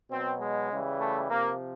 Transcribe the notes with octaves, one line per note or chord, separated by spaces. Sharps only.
B2 F#3 C4
G#3
C#3 E3 G3
A3
C3 F3 A#3